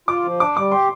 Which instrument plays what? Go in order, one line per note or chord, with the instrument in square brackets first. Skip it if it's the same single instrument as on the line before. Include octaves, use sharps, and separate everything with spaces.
[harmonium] F4 [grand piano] D6
[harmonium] F3
[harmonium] D4 [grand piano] D6
[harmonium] G3 [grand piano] D6
[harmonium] G4 [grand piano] C6